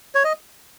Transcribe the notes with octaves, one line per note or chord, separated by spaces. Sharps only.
C#5
D#5